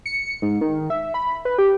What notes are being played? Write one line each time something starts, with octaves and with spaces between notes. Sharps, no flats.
C#7
G#2
D#3
E5
B5
B4
G4